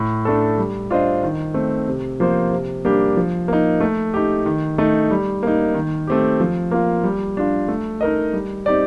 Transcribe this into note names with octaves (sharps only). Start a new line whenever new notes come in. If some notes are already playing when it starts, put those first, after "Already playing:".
Already playing: A2
A3 D4 A4
G3
D4 F4 C5 D#5
D#3
A3 C4
C3
F3 A#3 F4 C5
C3
G3 A#3 D4 G4
F3
A#3 D#4
A3
D#4 G4
D#3
A3 D#4
G3
A#3 D#4
D#3
A3 C4 G4
F3
A#3 F4
G3
D4 F4
A3
D#4 A#4 D#5
G3
C4 D#4 G4 D5